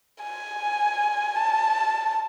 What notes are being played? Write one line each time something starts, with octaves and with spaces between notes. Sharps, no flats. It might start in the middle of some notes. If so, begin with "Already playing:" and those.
G#5
A5